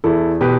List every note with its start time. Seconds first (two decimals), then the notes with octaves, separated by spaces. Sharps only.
0.04 E2 E4 A4
0.41 B2 G4 B4